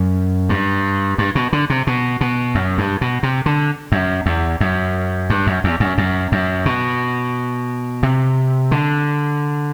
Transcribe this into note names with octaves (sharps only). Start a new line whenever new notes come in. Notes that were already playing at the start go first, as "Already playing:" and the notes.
Already playing: F#2
G2
G2
B2
D3
C3
B2
B2
F#2
G2
B2
C3
D3
F#2
E2
F#2
G2
F#2
E2
F#2
F#2
F#2
B2
C3
D3